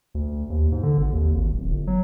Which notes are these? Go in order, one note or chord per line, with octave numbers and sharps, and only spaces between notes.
D2
D#2
G#2
D3
G#1
D#2
G#1
D1
G1
F#3